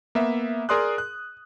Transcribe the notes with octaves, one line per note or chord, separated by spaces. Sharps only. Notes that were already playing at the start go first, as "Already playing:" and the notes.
A#3 B3 E5
G#4 A#4 D5 C6 D#6 F#6
F#6